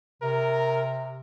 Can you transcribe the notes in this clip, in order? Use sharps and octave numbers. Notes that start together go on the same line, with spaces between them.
C3 A#4